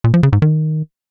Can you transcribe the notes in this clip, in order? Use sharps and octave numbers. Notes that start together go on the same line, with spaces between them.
A#2
F3
C#3
G#2
D#3